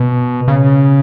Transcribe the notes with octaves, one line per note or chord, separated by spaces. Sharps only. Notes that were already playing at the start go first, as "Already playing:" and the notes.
Already playing: B2
C#3